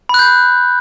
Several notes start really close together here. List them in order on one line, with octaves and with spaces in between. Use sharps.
B5 F#6 G6